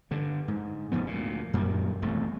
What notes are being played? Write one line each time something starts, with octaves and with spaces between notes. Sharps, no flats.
G2 D3
G#2
F1 G#2 F3 B3
D2 A#2
F#2 A#2 D#3 G3
E1 C2 F2 A3